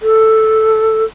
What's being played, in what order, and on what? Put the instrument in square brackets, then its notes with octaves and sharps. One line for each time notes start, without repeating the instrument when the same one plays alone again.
[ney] A4